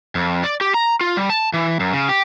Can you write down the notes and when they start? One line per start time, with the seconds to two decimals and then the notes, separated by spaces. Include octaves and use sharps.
0.15 F2
0.44 D5
0.61 G4
0.74 A#5
1.01 F4
1.17 G3
1.30 A5
1.54 E3
1.80 F#2
1.93 C#3
2.09 G4